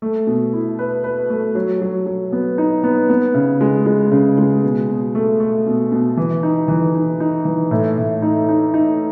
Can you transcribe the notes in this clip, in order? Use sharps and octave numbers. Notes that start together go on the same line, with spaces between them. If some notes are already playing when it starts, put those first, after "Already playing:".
A3
B2
E4
B4
B4
A3
F#3
F#3
F#3
B3
D#4
B3
B3
C#3
G#3
G#3
C#3
G#3
B2
B2
A3
A3
B2
B2
E3
D#4
E3
D#4
D#4
E3
A2
A2
D#4
D#4
D#4